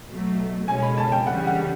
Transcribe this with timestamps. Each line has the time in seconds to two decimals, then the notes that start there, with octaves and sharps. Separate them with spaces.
0.08 B2 F#3 A3
0.68 B2 G#3 C#4 G#5
0.82 B5
0.98 A5
1.12 G5
1.27 C#3 E3 G3 F#5
1.47 F#5